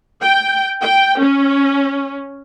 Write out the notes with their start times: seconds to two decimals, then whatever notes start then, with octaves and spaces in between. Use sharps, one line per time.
0.22 G5
0.81 G5
1.20 C#4